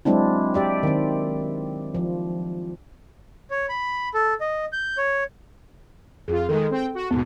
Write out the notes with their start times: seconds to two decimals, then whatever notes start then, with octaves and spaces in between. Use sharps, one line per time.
0.05 F#3 G#3 C4 D4 E4
0.54 G4 D5 E5
0.83 D#3 C4
1.95 F3
3.51 C#5
3.69 B5
4.14 A4
4.41 D#5
4.73 G6
4.97 C#5
6.28 F2 F4 G#4
6.49 D#3 G#3 A4
6.70 C4 G5
6.95 F#4
7.11 D#2 G#2 B2 B3